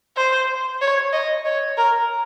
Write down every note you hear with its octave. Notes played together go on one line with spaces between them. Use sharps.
C5
C#5
D#5
C#5
A#4